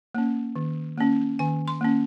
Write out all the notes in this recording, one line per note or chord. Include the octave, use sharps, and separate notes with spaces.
A#3 C#4
D#3
A#3 C#4
D#3 G#5
C6
A#3 C#4